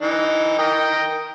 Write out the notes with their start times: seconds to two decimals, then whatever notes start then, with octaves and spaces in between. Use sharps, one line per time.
0.02 E3 D#4
0.59 A#4 D#5 G5